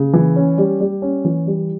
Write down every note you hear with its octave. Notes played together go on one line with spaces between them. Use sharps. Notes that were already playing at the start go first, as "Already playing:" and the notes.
Already playing: C#3
E3
C#4
G3
G3
C#4
E3
G3